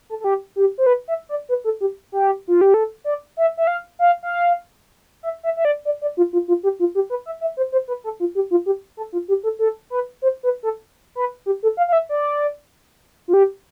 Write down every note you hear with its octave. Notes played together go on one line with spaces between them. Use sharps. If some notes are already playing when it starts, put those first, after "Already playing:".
A4
A4
G4
G4
C5
B4
E5
D5
B4
A4
G4
G4
F4
G4
A4
D5
E5
E5
F5
F5
F5
E5
E5
E5
D5
D5
D5
F4
F4
F4
G4
F4
G4
B4
E5
E5
C5
C5
B4
A4
F4
G4
F4
G4
A4
F4
G4
A4
A4
B4
C5
B4
A4
B4
G4
A4
F5
F5
E5
D5
F4
G4